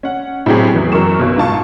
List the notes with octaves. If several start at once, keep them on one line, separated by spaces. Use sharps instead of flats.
C#4 F#5
A2 F#3 C4 G4 G#4
E2 E3 F#3
F#2 A#4 C#6 E7
B1 B2
G#2 F4 A5 C#6